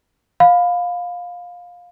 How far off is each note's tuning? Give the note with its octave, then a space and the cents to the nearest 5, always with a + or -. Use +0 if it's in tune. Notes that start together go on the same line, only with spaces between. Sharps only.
F5 +20 B5 +15